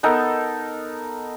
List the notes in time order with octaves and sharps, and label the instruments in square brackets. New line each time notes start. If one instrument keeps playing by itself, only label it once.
[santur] B3 D#4 A4 A#4